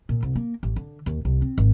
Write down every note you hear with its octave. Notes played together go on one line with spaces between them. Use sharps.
A#2
C2
A#3
A1
D3
D#2
C2
C4
G#1